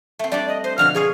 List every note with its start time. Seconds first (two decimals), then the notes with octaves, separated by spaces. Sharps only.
0.19 A3 C4
0.32 G3 D4 G4 D5
0.48 D#5
0.64 C5 D#5 C6
0.78 B2 D3 F3 F6
0.94 F4 G#4 C#5 F5